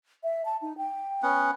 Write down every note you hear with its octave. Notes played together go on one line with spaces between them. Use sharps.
E5
A5
D#4
G5
B3 C#4 F#5